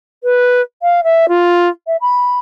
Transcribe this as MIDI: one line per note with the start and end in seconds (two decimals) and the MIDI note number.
0.24 0.61 71
0.82 1.01 77
1.04 1.26 76
1.28 1.69 65
1.87 1.97 76
2.01 2.39 83